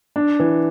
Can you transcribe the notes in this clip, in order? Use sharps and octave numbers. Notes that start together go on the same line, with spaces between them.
D4
E3